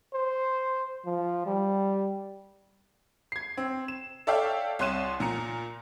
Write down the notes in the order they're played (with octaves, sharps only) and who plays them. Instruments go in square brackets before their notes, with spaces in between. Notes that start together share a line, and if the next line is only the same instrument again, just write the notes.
[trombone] C5
F3
G3
[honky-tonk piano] G#6 C7
C4
E7
A4 C#5 D5 E5 F5 G5
C2 C#5 C6 F#6 D#7 E7
A#2 A#5 C#7